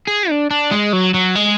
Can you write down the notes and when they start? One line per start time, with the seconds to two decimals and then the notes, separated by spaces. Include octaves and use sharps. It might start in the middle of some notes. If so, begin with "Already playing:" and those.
0.07 G#4
0.30 D4
0.51 D4
0.71 G#3
0.93 F#3
1.14 F#3
1.35 G#3